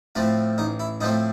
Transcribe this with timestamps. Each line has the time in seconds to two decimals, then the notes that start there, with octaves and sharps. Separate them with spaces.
0.15 A2 F3 A3 C4
0.58 A1 D#4
0.80 E4
1.01 A2 F3 A3 C4 D#4